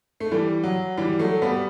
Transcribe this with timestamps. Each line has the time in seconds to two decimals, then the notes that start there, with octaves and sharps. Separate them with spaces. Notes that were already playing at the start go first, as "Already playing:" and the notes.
0.20 A3
0.31 E3 G3
0.63 F#3
0.97 E3 G3
1.19 F#3 A3
1.42 G3 B3